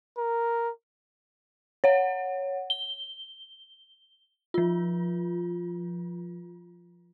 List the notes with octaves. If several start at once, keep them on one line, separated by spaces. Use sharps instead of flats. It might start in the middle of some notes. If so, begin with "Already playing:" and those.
A#4
C#5 F#5
G7
F3 F4